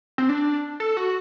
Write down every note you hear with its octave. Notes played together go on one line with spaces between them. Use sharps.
C4
D4
A4
F#4